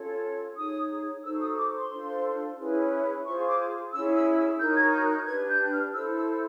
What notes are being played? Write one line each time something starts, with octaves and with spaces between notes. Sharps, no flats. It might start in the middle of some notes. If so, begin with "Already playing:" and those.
Already playing: C#4 F4 A4 C#5
D#4 G#4 C#5 D#6
D#4 F#4 A4 C5 E6
D#6
D6
C6
D4 F4 A4 C5
C#4 E4 G#4 B4
F4 G#4 C5 C#6
D6
C#4 E4 G#4 E6
E6
E6
D#4 F#4 A#4 C#5 G6
G#6
G6
F#6
G6
D4 G4 B4 G#6
G6
F6
E4 A4 C5 E6
E6